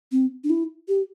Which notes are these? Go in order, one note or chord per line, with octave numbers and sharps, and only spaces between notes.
C4
D4
E4
G4